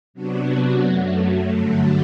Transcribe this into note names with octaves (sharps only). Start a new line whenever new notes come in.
C3 F#3 B3 D4 F#4
F#2 F#3 A3
G2 D3 F#3 A3